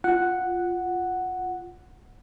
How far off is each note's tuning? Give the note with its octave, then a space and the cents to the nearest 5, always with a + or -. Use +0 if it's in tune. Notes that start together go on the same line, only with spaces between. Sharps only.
F4 +0 F#5 +0